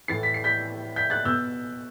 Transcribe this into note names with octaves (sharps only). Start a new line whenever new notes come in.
A2 E3 A6 C7
B6
C7
G6 B6
G6 B6
F#6 A6
B2 E6 G6